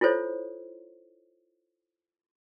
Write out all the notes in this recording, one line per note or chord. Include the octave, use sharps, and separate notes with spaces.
E4 F4 A4 C5 C#5